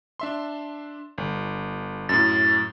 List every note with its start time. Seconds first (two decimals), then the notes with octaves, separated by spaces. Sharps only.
0.20 D4 E5 C6
1.18 G1
2.09 F#2 A2 A6